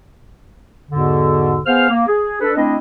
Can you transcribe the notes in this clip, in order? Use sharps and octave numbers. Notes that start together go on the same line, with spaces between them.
E2 G#2 B2 D3
B3 G#4 C5 F5 F6
A#3
G#4
D4 A4 B4
A3 C4 D4 E4 D#5